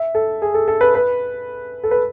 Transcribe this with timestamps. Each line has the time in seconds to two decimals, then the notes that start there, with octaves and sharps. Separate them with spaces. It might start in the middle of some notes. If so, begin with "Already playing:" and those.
Already playing: E5
0.15 A4
0.42 G#4
0.54 A4
0.68 A4
0.81 B4
0.95 B4
1.84 A4
1.91 B4